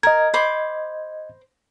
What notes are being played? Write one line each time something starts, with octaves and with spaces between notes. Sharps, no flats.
A#4 D#5 G#6
C5 B5 D6